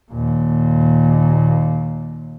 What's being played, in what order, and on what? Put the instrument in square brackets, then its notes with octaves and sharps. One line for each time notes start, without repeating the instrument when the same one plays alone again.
[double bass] D#2 A#2